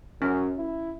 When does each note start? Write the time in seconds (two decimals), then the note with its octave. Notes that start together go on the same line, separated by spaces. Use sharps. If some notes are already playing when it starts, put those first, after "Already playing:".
0.22 F#2 C#4
0.58 E4